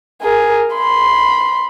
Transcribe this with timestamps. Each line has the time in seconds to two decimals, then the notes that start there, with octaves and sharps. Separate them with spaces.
0.23 G#4 A#4
0.75 B5 C6